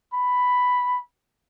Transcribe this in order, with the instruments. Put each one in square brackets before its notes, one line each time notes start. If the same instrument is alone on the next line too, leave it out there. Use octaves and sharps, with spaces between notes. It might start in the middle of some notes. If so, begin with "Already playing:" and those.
[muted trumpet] B5